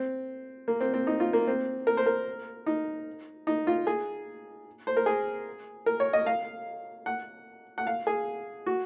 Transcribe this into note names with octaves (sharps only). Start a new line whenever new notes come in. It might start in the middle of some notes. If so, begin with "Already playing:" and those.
Already playing: C4
A#3
C4
C4
D#4
F4
A#3
C4
A#4
C5
A#4
D#4
D#4
F4
G#4
C5
A#4
G#4
A#4
C#5
D#5
F5
F#5
F#5
F5
G#4
F#4